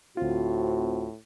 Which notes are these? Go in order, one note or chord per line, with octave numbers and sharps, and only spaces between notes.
D2 A2 C4 F4 F#4